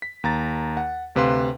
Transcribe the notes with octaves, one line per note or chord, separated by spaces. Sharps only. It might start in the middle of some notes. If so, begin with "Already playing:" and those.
B6
D#2 A#5 A6
F#5
D2 C3 B4 F5 C6